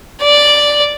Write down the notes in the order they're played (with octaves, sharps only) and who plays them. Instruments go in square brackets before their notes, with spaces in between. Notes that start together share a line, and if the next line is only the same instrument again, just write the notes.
[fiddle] D5